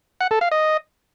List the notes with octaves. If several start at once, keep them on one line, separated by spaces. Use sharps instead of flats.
F#5
A4
F5
D#5